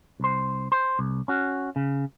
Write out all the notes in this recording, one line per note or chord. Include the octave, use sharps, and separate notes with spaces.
C2 C5
C5
C2
C#4 F#4
C#3